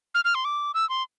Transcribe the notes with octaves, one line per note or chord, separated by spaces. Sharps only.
F6
F6
C6
D6
E6
C6